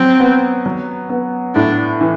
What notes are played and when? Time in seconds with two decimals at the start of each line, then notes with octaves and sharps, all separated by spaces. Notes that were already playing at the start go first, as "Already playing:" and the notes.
Already playing: F#3 C4
0.20 B3
0.66 F#3
1.10 B3
1.55 A2 D4
2.01 E3